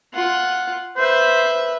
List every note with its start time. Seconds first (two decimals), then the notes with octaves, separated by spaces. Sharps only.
0.13 F4 F#5
0.97 B4 C5 E5